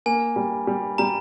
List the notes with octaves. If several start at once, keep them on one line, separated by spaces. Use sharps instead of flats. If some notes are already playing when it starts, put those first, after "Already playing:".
A#3 G#5
G3
G3
G3 A#5